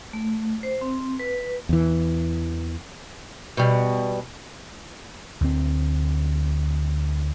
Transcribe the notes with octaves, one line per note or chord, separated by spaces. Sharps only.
A3
C5
C4
B4
E2 E3
B2 G3
D2 C4